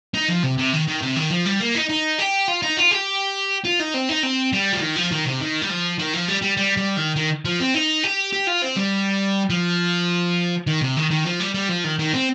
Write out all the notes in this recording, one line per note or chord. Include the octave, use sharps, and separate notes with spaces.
D#4
F3
C3
C3
D#3
D#3
C3
D#3
F3
G3
A#3
D#4
D#4
G4
F4
D#4
F4
G4
F4
D#4
C4
D#4
C4
G3
F3
D#3
F3
D#3
C3
D#3
G3
F3
D#3
F3
G3
G3
G3
G3
D#3
D#3
F3
C4
D#4
G4
G4
F4
C4
G3
F3
D#3
C3
D#3
D#3
F3
G3
G3
F3
D#3
D#3
C4